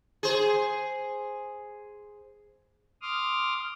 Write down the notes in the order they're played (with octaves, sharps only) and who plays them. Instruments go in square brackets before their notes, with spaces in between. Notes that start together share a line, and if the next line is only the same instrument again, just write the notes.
[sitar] G#4 C5
[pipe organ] C6 D6 D#6 F6